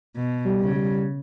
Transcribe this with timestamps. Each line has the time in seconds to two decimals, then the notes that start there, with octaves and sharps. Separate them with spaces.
0.16 B2
0.45 G3
0.61 C#3
0.76 G3